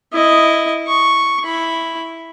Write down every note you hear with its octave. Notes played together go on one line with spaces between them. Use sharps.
E4 D#5
C#6
E4 B5